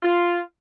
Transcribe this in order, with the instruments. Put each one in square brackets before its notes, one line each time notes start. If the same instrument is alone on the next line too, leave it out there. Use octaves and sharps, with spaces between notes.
[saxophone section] F4